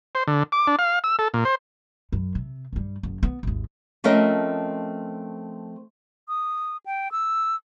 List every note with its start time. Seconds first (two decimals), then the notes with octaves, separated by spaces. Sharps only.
0.15 C5
0.28 D3
0.52 D6
0.67 D4
0.79 F5
1.04 E6
1.19 A4
1.34 A#2
1.45 C5
2.12 F#2
2.35 C3
2.73 G2 G3
3.03 F#1
3.23 B3
3.43 G#1 D#2
4.04 F3 A3 C4 C#4 A#4 D#5
6.28 D#6
6.86 G5
7.12 E6